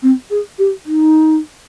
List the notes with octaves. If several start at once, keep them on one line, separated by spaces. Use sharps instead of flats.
C4
G#4
G4
D#4